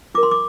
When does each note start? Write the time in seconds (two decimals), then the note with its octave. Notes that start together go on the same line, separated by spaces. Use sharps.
0.15 F4 D6
0.18 A#4
0.23 C6
0.31 D6